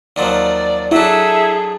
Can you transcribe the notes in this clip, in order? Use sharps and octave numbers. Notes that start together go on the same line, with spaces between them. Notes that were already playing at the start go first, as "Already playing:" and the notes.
D#2 F3 F#3 D5
F#3 D4 E4 G#4 A4 E5